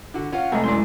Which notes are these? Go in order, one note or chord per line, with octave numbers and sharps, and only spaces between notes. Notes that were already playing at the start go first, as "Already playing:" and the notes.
D3 F#4
C#4 F4 F5 F#5
F1 C2 G#3 A3 D#5 G#5
F#2 G#3 E4 D5 C6